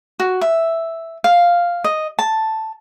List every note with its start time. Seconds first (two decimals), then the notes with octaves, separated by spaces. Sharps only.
0.20 F#4
0.41 E5
1.24 F5
1.84 D#5
2.19 A5